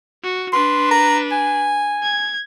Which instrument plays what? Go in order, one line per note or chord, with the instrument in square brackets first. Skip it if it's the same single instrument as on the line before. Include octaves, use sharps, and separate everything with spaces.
[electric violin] F#4
[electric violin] D4 B4 [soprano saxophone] C6
[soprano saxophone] A#5
G#5
[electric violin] G#6